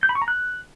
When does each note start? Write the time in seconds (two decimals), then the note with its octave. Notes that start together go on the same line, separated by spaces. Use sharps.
0.03 G6
0.09 B5
0.15 C#6
0.22 A#5
0.28 F#6